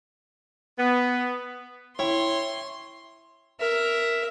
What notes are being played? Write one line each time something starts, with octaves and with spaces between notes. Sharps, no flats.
B3
E4 C#5 E5 G5 C6
A#4 E5